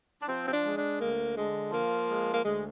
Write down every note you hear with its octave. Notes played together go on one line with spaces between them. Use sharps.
D4
F3 C4
C4
D4
G#3
D4
D2 A#3
D3 G#3
F3 A#3
G#3
A#3
D2 G#3